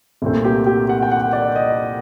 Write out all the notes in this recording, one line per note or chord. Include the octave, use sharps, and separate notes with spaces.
C2 A#2 A3 C4
G4
G4
F#5
G5
F#5
D5
D#5